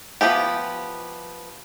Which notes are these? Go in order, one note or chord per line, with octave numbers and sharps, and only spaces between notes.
F3 B3 E4 G4